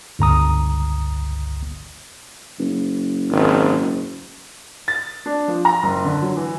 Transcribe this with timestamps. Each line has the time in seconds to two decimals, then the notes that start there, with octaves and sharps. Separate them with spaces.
0.19 G1 C#2 A#5 D#6
2.59 F#1
3.30 G#1
4.88 A6
5.26 D4
5.48 F3
5.65 A#5
5.83 F#1
6.05 D3
6.22 F#3
6.37 E3